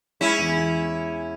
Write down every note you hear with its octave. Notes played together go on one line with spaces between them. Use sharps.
G#3 C#4 E4
E2
E2